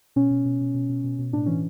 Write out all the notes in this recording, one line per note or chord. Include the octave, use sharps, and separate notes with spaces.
B2 C#4
B2
B2
B2
B2
B2
B2
B2
A2 D4
E3 C#4